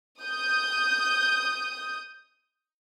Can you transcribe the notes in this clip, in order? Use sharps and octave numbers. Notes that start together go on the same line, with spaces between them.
D#6 G6